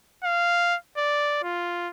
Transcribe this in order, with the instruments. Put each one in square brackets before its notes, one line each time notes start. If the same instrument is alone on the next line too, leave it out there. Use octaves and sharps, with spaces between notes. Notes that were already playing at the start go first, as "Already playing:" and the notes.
[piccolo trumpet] F5
D5
F4